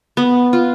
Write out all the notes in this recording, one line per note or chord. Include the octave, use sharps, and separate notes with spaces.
B3
F4